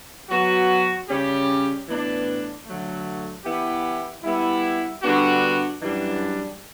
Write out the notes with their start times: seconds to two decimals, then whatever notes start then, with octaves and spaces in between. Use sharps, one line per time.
0.29 F#3 B3 F#4
1.08 C#3 G3 C#4 G4
1.87 A2 E3 B3 D4
2.65 D3 F#3 A3
3.44 E3 B3 E4 G4
4.23 G3 B3 E4
5.02 D3 G3 B3 D4 F#4
5.80 F#2 E3 G3 D4